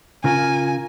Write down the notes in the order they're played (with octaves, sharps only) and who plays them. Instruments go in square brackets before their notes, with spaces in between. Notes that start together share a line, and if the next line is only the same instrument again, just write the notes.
[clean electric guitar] C#3 F4 A#4 [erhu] G#5